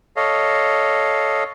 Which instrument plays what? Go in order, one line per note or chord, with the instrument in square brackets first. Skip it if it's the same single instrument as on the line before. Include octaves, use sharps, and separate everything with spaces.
[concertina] A4 C#5 D#5 F5